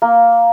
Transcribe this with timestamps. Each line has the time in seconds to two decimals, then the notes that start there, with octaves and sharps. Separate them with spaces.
0.02 A#3